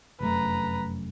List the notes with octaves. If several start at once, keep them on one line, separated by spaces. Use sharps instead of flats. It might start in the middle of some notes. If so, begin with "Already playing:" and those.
F1 F#2 A3 B4 A#5